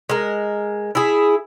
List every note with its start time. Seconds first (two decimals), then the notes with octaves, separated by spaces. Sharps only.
0.09 G#3 A#4
0.95 E4 G#4